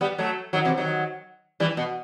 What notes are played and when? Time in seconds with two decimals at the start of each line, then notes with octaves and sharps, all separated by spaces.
0.01 G3 B3
0.18 F#3 A3
0.53 D#3 F#3
0.65 C3 E3
0.77 D#3 F#3
1.60 E3 G3
1.77 B2